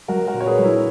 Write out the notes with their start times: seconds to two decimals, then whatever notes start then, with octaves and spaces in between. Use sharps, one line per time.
0.08 F#3 F#4 A#4
0.27 F#4 A#4
0.34 A#2
0.40 C#5
0.46 G#4 B4
0.59 F#3
0.65 E4